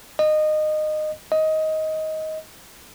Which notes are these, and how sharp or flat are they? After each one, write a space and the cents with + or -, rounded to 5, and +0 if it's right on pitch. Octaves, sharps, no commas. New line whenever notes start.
D#5 -20
D#5 +15